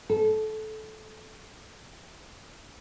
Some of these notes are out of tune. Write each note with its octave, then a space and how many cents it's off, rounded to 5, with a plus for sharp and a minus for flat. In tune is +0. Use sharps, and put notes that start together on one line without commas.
A4 -20